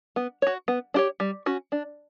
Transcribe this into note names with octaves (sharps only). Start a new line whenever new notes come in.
B3
F#4 C#5
B3
D4 G4 C#5
G3
C#4 F#4
D4